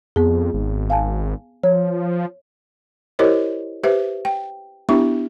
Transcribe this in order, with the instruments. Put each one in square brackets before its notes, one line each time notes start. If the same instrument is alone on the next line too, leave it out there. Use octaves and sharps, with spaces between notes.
[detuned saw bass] F2 [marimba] B3 G#4
[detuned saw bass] G#1
[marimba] F5 G#5 A5
[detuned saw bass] F3 [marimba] C#5
[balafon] E4 G4 A#4 C5 C#5 D#5
G4 B4 C5 E5
G5
B3 D4 E4 G4 E5 C#6